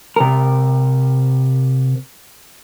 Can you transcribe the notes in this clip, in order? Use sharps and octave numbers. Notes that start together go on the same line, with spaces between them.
C3 A#4